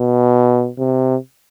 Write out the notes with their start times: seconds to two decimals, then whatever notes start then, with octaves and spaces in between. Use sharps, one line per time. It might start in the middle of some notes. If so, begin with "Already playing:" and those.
Already playing: B2
0.78 C3